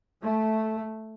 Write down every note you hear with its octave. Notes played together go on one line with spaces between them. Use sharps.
A3